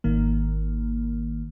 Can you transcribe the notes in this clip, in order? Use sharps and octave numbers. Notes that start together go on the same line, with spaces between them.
G#1 D#3 A#3